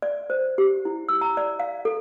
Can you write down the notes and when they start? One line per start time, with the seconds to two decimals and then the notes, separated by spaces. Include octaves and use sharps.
0.02 D5
0.30 C5
0.58 G4
0.85 E4
1.09 E6
1.21 A#5
1.37 D5
1.60 F5
1.85 A4